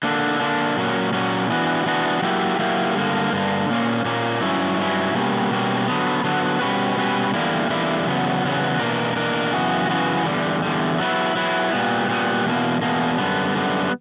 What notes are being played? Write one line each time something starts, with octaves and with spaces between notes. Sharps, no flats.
D3 A#3 D4
D3 A#3 D4
A#2 F#3 A#3 C#4
A#2 F#3 A#3 C#4
E3 B3 D4 F#4
E3 B3 D4 F#4
F#3 A#3 E4 G4
F#3 A#3 E4 G4
G2 D3 A#3
G2 D3 A#3
A#2 A#3 C#4
A#2 A#3 C#4
G2 F#3 C#4 E4
G2 F#3 C#4 E4
B2 G3 A#3 C#4
B2 G3 A#3 C#4
D3 F#3 B3
D3 F#3 B3
B2 G3 C#4 F#4 B4
B2 G3 C#4 F#4 B4
E2 D3 G3 A#3 E4
E2 D3 G3 A#3 E4
E2 C#3 F#3 B3
E2 C#3 F#3 B3
E2 B2 A#3 D4 A#4
E2 B2 A#3 D4 A#4
F#2 C#3 E3 B3 F#4
F#2 C#3 E3 B3 F#4
E2 D3 G3
E2 D3 G3
F#3 B3 E4
F#3 B3 E4
A#2 G3 B3
A#2 G3 B3
E2 B2 A#3
E2 B2 A#3
F#2 D3 G3 B3
F#2 D3 G3 B3